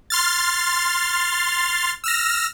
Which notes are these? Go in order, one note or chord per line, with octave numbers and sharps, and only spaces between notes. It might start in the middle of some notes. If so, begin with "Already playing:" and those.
C6 F6 A6
E6 F6 A#6